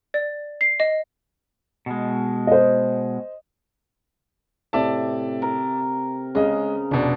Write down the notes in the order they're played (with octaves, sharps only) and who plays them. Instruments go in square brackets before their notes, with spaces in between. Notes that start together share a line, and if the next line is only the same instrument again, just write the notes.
[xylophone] D5
C7
D#5
[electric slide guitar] B2 G#3
[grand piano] C5 D#5
[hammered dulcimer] A2 C3 [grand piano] D5 E5 A5
[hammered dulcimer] A#4
[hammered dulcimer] C#3 [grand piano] G#3 D#5
[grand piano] F1 B2 D5 [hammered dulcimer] D4 A5